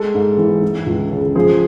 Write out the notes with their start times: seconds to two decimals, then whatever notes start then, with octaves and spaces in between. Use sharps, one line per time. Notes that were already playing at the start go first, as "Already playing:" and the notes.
Already playing: G#3 A4
0.14 G#2
0.38 E3
0.62 E3
0.86 C#2
1.12 C#3
1.35 F3 G#4